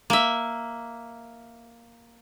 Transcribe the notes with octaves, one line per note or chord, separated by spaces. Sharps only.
A#3 E5